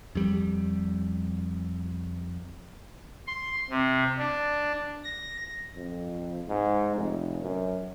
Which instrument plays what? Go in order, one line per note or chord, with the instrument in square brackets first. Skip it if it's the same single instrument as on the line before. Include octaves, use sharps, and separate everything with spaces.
[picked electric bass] F2 G3
[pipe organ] C6
C3
D4
A#6
[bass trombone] F2
G#2
F1
F#2